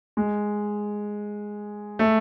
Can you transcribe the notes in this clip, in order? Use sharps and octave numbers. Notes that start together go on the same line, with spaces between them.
G#3
A3